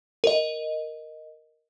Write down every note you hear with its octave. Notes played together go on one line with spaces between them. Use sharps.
A#4 D#5